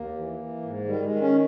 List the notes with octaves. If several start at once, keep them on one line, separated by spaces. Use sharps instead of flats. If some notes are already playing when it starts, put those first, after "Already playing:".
Already playing: D#2 A#3
E3
E3
G#2
D#3 G3
G#3
D#3
C#4